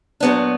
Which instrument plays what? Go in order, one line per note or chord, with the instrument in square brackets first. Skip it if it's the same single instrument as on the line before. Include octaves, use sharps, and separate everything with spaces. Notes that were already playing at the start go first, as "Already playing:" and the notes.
[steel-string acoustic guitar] A#2 F#3 B3 D4